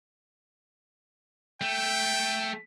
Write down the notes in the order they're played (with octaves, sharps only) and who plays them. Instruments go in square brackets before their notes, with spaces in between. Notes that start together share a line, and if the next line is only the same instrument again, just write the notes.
[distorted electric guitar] A3 [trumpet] G5